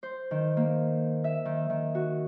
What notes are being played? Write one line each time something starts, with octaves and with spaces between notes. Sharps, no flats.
C5
D#3
A#3
E5
D#3
D#3
F#4